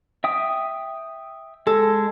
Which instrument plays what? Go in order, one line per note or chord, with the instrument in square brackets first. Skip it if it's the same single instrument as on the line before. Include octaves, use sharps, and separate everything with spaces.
[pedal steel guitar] E5 G5 D#6
[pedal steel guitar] G#3 [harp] A4